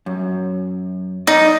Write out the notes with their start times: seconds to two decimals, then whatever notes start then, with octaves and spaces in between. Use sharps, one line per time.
0.06 F#2
1.27 D#4 D5